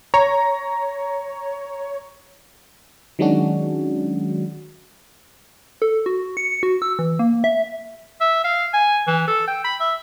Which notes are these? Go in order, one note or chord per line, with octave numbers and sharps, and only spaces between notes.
C#5 A#5
D#3 F#3 G#3 C#4 D4 F#4
A4
F#4
C#7
F#4
E6
E3
A#3
E5
E5
F5
G#5
E3
A4
G5
B5
E5